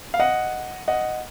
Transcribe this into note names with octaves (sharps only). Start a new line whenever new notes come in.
F5
D#5 F#5
D#5 F#5